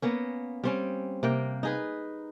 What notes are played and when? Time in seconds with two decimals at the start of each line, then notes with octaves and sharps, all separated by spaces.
0.02 A#3 B3 C#4
0.64 G3 C4 C#4
1.23 C3 A#3 G5
1.63 D#4 G#4 B4